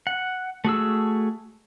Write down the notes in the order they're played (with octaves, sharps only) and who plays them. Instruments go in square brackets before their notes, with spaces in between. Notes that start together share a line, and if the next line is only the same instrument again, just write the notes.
[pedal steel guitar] F#5
A3 F#4 G#4 E6